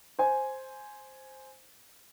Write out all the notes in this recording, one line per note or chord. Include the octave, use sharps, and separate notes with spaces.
C5 G#5